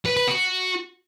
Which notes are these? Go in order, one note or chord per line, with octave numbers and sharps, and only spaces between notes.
B4
B4
F#4